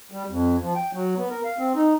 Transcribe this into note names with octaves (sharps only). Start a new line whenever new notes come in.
G3
F2
F3
G5
F#3
B3
A#4
F5
C4
D#4